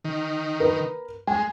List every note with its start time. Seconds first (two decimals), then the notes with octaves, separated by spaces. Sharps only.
0.05 D#3
0.60 A#4 B4
1.27 G#3 G#5